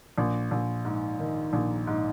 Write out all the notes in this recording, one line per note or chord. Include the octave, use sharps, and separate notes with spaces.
A#1
A#1
G#2
D#3
A#1
G#2